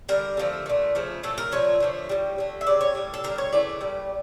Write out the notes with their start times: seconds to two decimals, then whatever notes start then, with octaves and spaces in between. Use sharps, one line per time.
0.09 D3 G3 A#4
0.37 D3 F3 A3
0.66 A#2 A3
0.95 C#3 F3 A3
1.23 A2 F3 A3 A4
1.38 A#4
1.51 A#2 F3 A3 C#5
1.80 D3 F3 A3
2.09 A2 G3
2.38 D3 A3
2.61 E5
2.67 C#3 G3 D5
2.81 C#5
2.95 A2 G3
3.14 A4
3.24 D3 G3 A#4
3.38 C#5
3.52 C#3 E3 A3 D5
3.81 A#2 G3